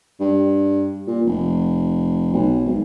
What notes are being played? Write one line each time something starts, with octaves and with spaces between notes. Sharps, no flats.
G2
A#2
F1
B1
G#1